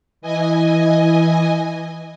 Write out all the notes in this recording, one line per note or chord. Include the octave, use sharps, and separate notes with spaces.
E3 D#5 G#5